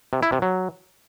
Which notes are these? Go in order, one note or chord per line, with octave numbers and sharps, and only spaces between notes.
C3
E4
C3
F#3